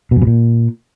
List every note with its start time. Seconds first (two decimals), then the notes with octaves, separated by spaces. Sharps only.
0.11 B2
0.16 F#2
0.22 B2
0.27 A#2